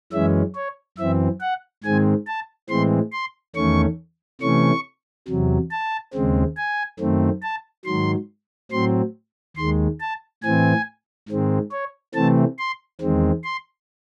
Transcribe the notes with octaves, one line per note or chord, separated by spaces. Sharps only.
F#2 E3 G#3 C#4 E5
C#5
F#2 E3 C4 E5
F#5
G#2 D#3 G#3 C4 G#5
A5
A2 E3 G#3 C4 C6
C6
E2 D#3 A3 C#4 C#6
C3 E3 A3 C#4 C#6
E2 C3 F#3
A5
D#2 C#3 G#3 C4
G#5
F#2 D#3 A3 C4
A5
G#2 D#3 F#3 C6
A2 F#3 C4 C6
D#2 D#3 G#3 C6
A5
A2 E3 C4 G#5
G#2 D#3 G#3 C4
C#5
C3 E3 A3 C4 A5
C6
E2 D#3 G#3 C4
C6